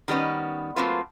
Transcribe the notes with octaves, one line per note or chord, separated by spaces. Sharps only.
D#3 G3 B3 C#4 B4
F#3 A3 A#3 C4 F4 B4